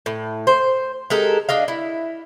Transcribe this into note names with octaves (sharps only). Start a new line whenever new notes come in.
A2
C5
G#3 G4 A4 A#4
D4 D#5 F5
E4